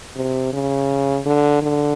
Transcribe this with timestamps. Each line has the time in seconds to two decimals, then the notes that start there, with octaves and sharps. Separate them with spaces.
0.16 C3
0.53 C#3
1.26 D3
1.62 D3